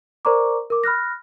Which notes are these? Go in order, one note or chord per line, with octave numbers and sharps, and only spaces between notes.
A#4 C5 D5 A#5 C#6 D6
A#4 D6
B5 F6 F#6 A#6